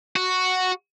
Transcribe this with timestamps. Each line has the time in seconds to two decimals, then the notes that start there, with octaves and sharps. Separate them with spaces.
0.16 F#4